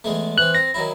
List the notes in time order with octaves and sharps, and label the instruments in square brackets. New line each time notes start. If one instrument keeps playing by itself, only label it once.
[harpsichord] E2 G#3 A3
[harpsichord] E3 C4 [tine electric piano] F#6
[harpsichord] C4 [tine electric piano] A#6
[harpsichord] D#3 F#3 E4